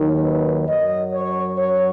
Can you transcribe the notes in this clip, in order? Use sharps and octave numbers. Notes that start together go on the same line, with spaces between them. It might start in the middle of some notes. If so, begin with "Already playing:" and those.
Already playing: D#2 D#3 F#3
B4
F#2 F#3 D#5
C#5
C#5